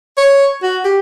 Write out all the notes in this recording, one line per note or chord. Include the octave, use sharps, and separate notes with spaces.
C#5
F#4
G4